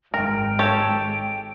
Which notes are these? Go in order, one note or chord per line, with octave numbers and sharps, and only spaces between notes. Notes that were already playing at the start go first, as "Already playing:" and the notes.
G#1 G#3 A#4 G5
G4 A4 C#5